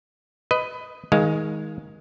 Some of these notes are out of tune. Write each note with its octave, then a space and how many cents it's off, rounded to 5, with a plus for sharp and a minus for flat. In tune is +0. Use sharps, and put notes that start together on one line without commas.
B4 +15 D#5 +0
D#3 +25 G#3 +0 F5 +0